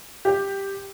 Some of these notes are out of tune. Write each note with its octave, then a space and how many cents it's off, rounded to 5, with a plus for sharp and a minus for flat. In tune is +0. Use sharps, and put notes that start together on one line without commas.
G4 +5